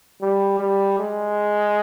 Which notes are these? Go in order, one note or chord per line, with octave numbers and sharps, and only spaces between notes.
G3
G3
G#3